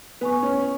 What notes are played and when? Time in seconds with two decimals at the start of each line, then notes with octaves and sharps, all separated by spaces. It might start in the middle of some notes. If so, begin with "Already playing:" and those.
0.21 B3 B4 G#5 C#6
0.43 C#4